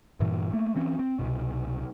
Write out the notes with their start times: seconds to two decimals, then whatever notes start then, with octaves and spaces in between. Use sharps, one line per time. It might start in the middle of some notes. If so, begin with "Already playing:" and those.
0.20 G2 A#2 E3
0.53 A3 A#3
0.76 E3 C4 C#4
0.99 C4
1.19 C2 F#2 B2